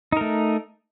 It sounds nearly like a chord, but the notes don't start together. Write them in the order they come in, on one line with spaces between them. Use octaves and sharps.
D#4 A#4 A3